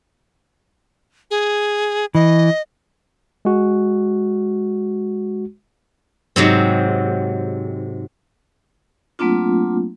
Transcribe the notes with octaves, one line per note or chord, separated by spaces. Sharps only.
G#4
E3 D#5
G#3 F#4
G#2 C3 F#3 C4
F#3 A3 A#3 C4 D4 F4